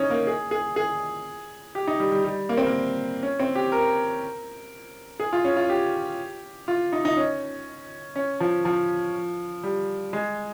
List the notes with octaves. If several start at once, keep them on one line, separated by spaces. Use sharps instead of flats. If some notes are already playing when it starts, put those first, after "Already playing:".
Already playing: C#4 D#4
A#3
G#4
G#4
G#4
G4
D#4
G3
G3
G3
A#3
C4
A#3
C#4
C4
G4
A#4
G#4
F4
C#4
F4
G4
F4
D#4
D#4
C#4
C#4
F3
F3
G3
G#3